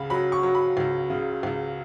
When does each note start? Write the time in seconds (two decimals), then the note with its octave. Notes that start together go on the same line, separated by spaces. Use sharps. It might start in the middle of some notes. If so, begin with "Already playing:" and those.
Already playing: C#2 C#3 B5
0.10 F#3 B5
0.32 C#6
0.43 F#3
0.55 B5
0.77 C#2
1.10 C#3
1.43 C#2